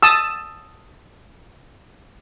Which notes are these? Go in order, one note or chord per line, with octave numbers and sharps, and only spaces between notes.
A5 D#6 E6